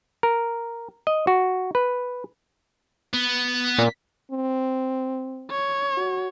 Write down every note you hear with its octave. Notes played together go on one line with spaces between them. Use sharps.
A#4
D#5
F#4
B4
B3
A#2
C4
C#5
F#4